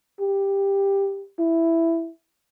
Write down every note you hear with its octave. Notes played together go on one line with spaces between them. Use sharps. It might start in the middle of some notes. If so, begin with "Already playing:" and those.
G4
E4